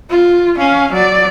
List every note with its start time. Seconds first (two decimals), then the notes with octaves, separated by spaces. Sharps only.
0.10 F4
0.58 C#4 F5
0.93 F#3 D5